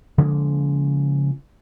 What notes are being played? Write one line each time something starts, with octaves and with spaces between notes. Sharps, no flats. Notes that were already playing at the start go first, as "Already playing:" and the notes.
C#3 F3 G#3 A#3